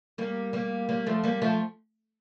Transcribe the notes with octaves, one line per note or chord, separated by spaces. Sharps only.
G3 A#3
G3 A#3
G3 A#3
F3 A3
G3 A#3
F3 A3